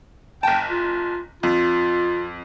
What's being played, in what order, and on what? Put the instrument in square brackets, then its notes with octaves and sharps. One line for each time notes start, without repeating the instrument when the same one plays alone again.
[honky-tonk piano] F#1 A5 [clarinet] G5
[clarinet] F4
[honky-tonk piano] F2 [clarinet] F4